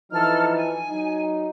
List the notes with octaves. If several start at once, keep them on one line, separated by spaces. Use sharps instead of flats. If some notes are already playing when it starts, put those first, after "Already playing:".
E3 F3 D#4 A4 F6
G#5
F#3 D#4